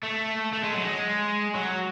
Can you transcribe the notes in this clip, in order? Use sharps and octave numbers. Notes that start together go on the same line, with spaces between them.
A3
A3
G#3
F#3
G#3
F#3